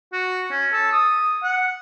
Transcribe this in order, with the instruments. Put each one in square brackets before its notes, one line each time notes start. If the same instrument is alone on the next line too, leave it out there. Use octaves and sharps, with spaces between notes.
[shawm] F#4
C#4
A4
D#6
F#5